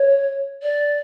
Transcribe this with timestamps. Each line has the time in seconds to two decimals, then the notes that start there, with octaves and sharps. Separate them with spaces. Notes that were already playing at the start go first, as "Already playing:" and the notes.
Already playing: C#5
0.62 D5